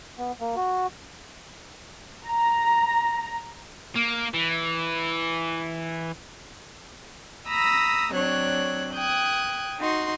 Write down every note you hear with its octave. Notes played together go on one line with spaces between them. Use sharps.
B3
A#3
F#4
A#5
A#3
E3
A#5 B5 D#6 E6 A#6
F#3 C4 D4 C#5 F#6
G5 D#6 F#6 G#6
D#4 F#4 C6